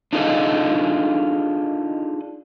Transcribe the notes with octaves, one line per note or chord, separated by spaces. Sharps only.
D4 D#4 F4 G#4 A4 D#5